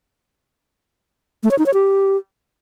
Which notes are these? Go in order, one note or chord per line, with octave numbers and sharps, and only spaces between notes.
A3
C#5
D#4
C#5
G4